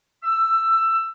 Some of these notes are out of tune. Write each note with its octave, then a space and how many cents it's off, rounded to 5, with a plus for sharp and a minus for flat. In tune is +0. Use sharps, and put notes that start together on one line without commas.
E6 +15